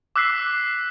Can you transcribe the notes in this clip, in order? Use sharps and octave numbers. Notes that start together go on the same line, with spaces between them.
D6 E6 F#6 B6 C7